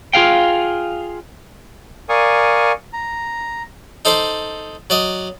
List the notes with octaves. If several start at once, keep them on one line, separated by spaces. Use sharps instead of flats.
F4 G#4 F5 G5
A#4 D5 F5 G#5 C#6 D#6
A#5
D#4 A4 C5 D5
F#3 D5 D#5